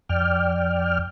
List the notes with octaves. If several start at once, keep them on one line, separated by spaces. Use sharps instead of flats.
F2 D5 G5 F6